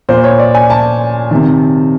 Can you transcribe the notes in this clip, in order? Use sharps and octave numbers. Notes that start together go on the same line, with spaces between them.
A#2 C5
C#5
D5
G#5
A5
C3 D#3